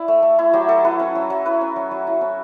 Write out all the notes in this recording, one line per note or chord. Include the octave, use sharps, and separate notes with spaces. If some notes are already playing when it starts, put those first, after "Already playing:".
Already playing: E4 D5 E5
A3
A3
E4
F#3 G4
F#3 A4
E4 B4
C#4
F#3
F#3
E4 B4
C#4
F#3
F#3
E4
C#4